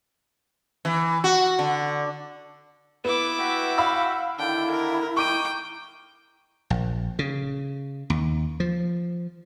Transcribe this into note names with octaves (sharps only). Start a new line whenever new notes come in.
E3
F#4
D3
B3 E4 D6
F#4 E5 F#5 G5
F5 B5 E6
D3 D#3 D4 E4 G5
A#4
D#4 G5 C#6 D6 D#7
A#1
C#3
D#2
F3